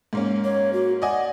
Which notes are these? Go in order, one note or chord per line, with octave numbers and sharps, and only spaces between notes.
G#2 A#3 C#4
C#5
F#4
D5 D#5 F#5 G#5